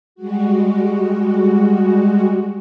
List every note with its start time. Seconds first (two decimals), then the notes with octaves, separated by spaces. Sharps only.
0.15 G3 G#3 F#4